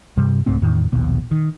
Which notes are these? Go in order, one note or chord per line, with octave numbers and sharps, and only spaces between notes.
G2 C3 G3
C2 G#2 A3 C4
E2 A2 D#3
A#1 D#2 B2
D#3